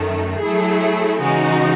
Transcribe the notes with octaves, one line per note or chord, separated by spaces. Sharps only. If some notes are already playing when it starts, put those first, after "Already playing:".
Already playing: F#2 D#3 A3
F#3 A3 E4 G#4
C#3 E3 G#3 D#4 F#4